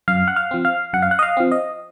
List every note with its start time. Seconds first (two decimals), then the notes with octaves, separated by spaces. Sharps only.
0.08 F#2 F5
0.28 F#5
0.36 F5
0.51 F3 C4
0.65 F5
0.93 F#2 F#5
1.02 F5
1.11 F#5
1.19 D#5
1.23 F5
1.37 F3 C4
1.51 D#5